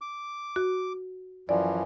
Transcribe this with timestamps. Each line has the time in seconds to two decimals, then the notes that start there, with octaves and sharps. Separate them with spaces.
0.01 D6
0.56 F#4
1.49 F#2 E3 F3 D5